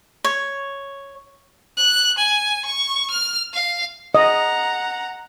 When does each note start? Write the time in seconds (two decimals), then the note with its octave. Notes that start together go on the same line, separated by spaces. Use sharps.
0.24 C#5
1.77 F#6
2.18 G#5
2.65 C#6
3.10 F6
3.53 F5
4.15 D#5 F#5 A#5